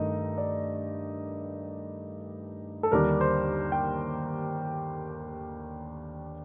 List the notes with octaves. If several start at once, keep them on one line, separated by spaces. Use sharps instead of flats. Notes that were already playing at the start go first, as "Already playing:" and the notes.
Already playing: G2 D#3 A3 D#4 D#5
D5
A4
D#2 D3 G3 D4 A#4
C5
G5